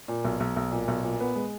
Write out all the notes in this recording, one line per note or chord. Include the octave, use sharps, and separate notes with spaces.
A#2
B1
B1
B1
A#2
B1
A#2
B3
G#3